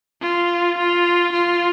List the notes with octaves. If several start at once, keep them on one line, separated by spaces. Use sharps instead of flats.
F4
F4
F4